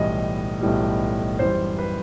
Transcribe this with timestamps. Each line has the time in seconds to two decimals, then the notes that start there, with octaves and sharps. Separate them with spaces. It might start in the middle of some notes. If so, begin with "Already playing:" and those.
Already playing: B1 A2 E3 G3 D#5
0.61 B1 A2 E3 G3
1.39 F#2 E3 G3 C5
1.78 B4